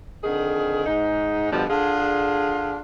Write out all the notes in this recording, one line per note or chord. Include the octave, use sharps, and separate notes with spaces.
F2 D3 D#3 G#4
G#2 D#4
G2 B2 D3 F3 G3
D3 D4 F4 G#4